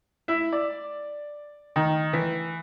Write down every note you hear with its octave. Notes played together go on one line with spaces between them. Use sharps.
E4
D5
D#3
E3